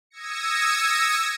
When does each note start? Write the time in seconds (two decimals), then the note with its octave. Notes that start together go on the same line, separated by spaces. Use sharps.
0.10 D#6 E6 G#6 A#6 C#7